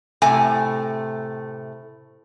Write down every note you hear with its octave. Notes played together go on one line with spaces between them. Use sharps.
A2 C3 A3 G#5